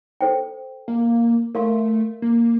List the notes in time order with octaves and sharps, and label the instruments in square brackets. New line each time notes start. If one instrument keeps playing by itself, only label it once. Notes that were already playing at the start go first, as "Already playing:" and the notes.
[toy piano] A4 C5 G5
[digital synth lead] A#3
[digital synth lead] A3 [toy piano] A#4 F5 C6
[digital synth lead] A#3